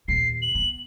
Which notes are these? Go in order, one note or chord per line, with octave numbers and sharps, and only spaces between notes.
D#2 A#2 C7
F#7
B3